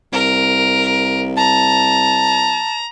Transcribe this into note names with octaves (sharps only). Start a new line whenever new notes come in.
C2 A#4
A5 A#5